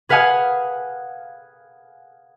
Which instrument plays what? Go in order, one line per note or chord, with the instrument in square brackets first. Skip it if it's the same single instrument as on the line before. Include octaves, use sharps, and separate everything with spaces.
[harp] G#4 B4 F5 F#5 G#5 D#6